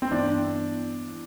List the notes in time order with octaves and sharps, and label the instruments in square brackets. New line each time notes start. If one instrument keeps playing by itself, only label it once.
[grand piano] C4
[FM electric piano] G2 E3 B3 E4 [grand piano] D4